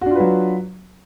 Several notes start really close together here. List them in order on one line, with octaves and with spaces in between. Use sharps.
F#4 D4 F4 B4 F#3